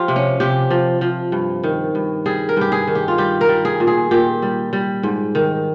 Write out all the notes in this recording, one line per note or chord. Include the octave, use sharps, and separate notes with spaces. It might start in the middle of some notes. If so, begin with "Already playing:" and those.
Already playing: F3 F4 G4
C3
C#4
C3 G4
F3
F3
G2
D#3
G2
G3 G#4
A#4
G2 G4
G#4
D#3
G4
F4
G3 G4
A#4
G3
G#4
A#2
G#4
A#2 G4
G3
G3
G#2
D#3